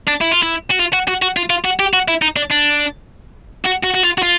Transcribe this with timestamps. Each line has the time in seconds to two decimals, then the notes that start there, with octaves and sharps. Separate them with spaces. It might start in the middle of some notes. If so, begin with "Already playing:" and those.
0.08 D4
0.21 E4
0.32 F4
0.43 E4
0.71 F#4
0.79 F4
0.93 F#4
1.08 F#4
1.22 F#4
1.37 F4
1.50 F4
1.65 F#4
1.80 G4
1.93 F#4
2.08 E4
2.22 D#4
2.36 D4
2.51 D4
3.66 F#4
3.84 F#4
3.95 F#4
4.04 F4
4.18 F#4
4.23 F4